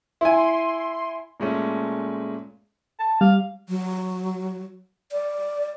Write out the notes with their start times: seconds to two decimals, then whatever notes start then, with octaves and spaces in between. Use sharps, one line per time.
0.21 E4 G#5 C6
1.40 A#2 G#3 A3 C#4
3.00 A5
3.21 G3 F5
3.69 F#3
5.12 D5